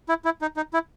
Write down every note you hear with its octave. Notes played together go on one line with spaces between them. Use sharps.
E4
E4
D#4
D#4
E4